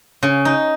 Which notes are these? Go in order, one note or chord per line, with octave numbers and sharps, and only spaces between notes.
C#3
D#4